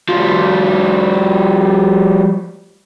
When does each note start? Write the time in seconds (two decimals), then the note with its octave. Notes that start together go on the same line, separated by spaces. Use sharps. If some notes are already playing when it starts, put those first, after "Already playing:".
0.09 F3 G3